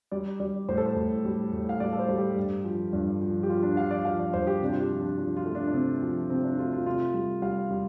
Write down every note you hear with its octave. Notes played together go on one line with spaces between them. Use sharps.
G3 D5
G3 D5
A2 C5
A4
C5
A2
G3
A2
F5
G3 D5
A4
C5
G3
G4
G2
F3
G2
F3
G4
F3 F4
D4
F3 F5
D5
F3 F5
D5
G2 C5
G4
C3 D4
F4
G4
F3
D4
F3 D4
F4
A3
D4
D4
C3 C4
F3
C3 C4
D4
A3 F4
F4
C3 F4
G3
G3 F5
G3